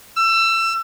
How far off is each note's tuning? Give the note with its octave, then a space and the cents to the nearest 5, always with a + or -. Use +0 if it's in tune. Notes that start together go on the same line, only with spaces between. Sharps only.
E6 +25